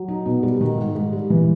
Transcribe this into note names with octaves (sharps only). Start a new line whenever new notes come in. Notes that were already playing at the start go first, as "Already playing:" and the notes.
Already playing: F#3
D#4
B2
G3
D#3
G#2
G#2
G3
E3